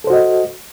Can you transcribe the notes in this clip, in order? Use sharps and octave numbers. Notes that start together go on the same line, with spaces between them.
F#4 A4 C5 D#5